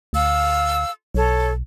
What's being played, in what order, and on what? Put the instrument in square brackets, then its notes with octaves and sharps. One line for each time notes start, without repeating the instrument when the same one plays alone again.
[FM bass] D2 [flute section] F5 E6
[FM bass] B1 [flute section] A4 C#5